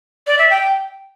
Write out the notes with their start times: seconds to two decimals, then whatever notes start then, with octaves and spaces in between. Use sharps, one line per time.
0.27 D5
0.39 E5
0.50 G5